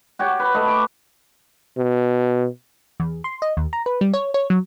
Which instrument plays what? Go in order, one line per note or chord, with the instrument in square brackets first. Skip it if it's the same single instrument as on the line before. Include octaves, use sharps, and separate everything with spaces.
[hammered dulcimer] F#4 G4 C#5
B4
A3 D#5
D6
[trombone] B2
[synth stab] E2
C6
D#5
D#2
A#5
B4
G3
C#5
C#5
F#3